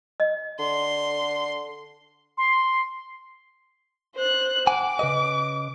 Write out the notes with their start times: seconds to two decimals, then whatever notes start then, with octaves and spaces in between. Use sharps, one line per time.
0.20 D#5
0.59 D3 C6
2.38 C6
4.15 C5 F#6
4.67 F#5 G#5 D6
4.99 C#3 B4 D#5